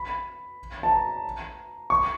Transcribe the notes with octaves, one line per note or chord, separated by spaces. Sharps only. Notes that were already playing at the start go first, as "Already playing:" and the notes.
Already playing: B5
A5
A#5
C#6